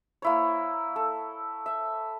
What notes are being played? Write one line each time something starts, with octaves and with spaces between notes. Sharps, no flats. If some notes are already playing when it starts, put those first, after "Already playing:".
A#3 E4 C#5
A4
E5